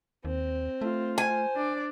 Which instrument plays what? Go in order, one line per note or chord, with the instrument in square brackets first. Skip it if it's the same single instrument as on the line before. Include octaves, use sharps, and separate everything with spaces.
[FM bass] D#2 [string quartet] C4
[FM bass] A3 [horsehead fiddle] F4
[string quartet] C5 [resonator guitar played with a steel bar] G#5
[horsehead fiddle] D4 D5